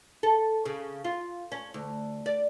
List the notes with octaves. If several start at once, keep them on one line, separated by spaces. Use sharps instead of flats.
A4
C#3
F4
C#4
D2
D5